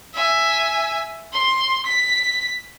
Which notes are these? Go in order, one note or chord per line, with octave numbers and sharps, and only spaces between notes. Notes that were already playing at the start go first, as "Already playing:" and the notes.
E5 G#5
C6
B6